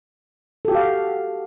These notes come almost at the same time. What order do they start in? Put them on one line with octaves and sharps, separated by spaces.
A4 G4 F#4 F5